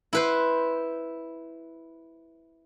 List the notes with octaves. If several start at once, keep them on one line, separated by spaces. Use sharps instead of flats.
E4 B4 C5